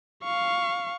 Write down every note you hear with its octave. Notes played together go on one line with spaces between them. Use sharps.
F5 C#6